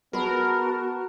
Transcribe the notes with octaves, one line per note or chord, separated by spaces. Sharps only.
B3 F#4 G#4 A#4 A5 B5 F6